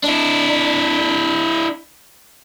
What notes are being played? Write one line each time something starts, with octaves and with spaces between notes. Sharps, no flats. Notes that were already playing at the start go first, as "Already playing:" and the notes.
D4 E4